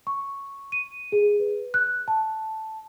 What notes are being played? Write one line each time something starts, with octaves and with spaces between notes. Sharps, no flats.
C#6
D#7
G#4
B4
F#6
A5